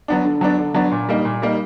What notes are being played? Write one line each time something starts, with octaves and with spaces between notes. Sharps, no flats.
F#3 B3 D4
D3
F#3 B3 D4
D3
F#3 B3 D4
A#2
G3 A#3 D#4
A#2
G3 A#3 D#4